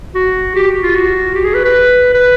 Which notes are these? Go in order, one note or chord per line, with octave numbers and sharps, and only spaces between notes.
F#4
G4
F4
F#4
G4
G#4
B4
B4
B4